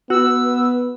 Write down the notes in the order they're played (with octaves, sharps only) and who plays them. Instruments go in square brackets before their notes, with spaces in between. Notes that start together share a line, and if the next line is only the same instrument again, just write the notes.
[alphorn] B3 [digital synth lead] F#4 [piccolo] E6